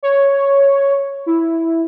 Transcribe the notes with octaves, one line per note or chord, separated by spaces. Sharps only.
C#5
E4